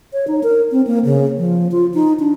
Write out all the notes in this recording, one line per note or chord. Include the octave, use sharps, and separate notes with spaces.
C#5
D#4
A#4
C4
A#3
C#3
F3
F4
D#4
D4